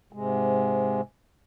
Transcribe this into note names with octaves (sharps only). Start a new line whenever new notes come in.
G#2 C3 G#3